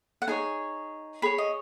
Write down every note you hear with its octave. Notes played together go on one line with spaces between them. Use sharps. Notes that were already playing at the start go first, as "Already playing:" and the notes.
F#5
D#4 G#4 C#5 G#5
G#4 C#5 B5
D#5